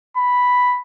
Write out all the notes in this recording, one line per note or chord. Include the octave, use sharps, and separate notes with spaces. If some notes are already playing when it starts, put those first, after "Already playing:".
B5